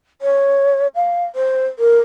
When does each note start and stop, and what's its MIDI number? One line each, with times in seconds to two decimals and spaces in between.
0.22 0.87 73
0.95 1.25 77
1.35 1.66 72
1.79 1.99 70